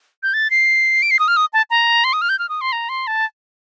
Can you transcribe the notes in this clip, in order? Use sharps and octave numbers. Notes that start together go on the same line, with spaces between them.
G6
A6
C7
D7
C7
D#6
F6
D#6
A5
A#5
C6
D#6
F6
G6
F6
D#6
C6
A#5
C6
A5